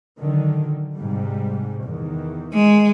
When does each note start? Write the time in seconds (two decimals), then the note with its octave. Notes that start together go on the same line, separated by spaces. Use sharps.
0.19 D3 D#3 F#3
0.95 G#2 C3 G3
1.84 E2 D#3
2.53 G#3